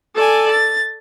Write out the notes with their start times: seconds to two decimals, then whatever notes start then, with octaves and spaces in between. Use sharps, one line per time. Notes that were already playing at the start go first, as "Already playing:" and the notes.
0.15 A4 D5 G#5
0.51 A6